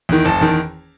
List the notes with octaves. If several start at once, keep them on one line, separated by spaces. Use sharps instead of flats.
E2 D#3
F#1 A5
E2 D#3